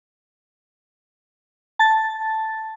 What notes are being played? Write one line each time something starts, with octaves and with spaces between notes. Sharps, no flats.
A5 A6